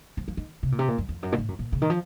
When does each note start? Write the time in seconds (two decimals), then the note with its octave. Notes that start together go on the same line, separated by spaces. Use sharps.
0.17 F3
0.28 F3
0.37 D#3
0.63 C3
0.72 A#2
0.79 C3
0.88 A#2
0.98 F#2
1.09 F2
1.23 F#2
1.32 A#2
1.38 A2
1.48 F#2
1.59 A#2
1.72 C#3
1.82 D#3
1.90 F3